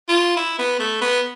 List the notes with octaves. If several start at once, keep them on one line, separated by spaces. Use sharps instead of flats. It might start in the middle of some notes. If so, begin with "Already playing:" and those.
F4
E4
B3
A3
B3